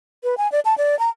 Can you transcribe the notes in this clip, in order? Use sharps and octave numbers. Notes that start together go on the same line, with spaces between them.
B4
G#5
D5
A5
D5
A#5